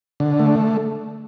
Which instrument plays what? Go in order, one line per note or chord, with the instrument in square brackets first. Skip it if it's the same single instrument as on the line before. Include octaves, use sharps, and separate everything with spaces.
[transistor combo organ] D3
A3